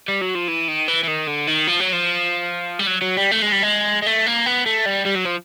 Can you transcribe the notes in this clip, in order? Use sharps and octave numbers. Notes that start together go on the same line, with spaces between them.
G3
F#3
F3
E3
D#3
E3
E3
D#3
D3
D#3
F3
F#3
F3
G3
F#3
F#3
G3
A3
G#3
G3
G#3
G#3
A3
A#3
B3
A3
G3
G3
F#3
F3